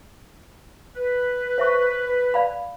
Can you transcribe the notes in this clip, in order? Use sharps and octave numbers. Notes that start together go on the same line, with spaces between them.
B4
C5 E5 C#6
D5 F5 B5